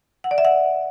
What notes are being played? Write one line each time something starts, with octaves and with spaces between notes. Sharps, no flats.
F#5
D5
E5
F#5